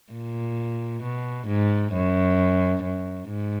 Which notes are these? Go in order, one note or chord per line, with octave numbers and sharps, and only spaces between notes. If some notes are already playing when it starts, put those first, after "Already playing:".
A#2
B2
G#2
F#2
F#2
G#2